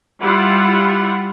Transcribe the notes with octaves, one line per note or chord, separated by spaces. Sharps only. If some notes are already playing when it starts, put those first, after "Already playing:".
G3 E4 F4 F#5